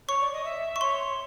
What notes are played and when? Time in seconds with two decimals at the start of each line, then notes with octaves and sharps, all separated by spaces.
0.08 C#5 C#6
0.21 D5
0.33 D#5
0.44 E5
0.76 C#6
0.81 C#5 C6